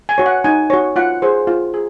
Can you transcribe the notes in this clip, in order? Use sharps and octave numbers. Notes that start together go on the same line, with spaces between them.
G#5
F#4 C#5
F#5
D#4 G#5
F#4 C#5
F4 F#5
G#4 C5
F4
G#4